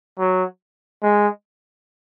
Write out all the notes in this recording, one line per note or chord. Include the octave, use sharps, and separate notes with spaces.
F#3
G#3